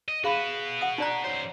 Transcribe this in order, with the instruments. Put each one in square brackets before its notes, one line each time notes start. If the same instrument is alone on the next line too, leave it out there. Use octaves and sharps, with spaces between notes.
[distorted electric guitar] D#5
[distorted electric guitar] F#4 B4 [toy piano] G#4 F5 B5
[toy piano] F#5 D#6
D#4 D5 A#5
[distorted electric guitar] F#2 C5 [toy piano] C#5